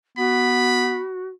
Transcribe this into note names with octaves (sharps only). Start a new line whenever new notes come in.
B3 F#4 B5